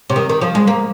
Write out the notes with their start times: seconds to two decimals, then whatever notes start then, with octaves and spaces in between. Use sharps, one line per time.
0.10 C3
0.16 D#3
0.29 D#3
0.41 F3
0.55 G#3
0.67 A#3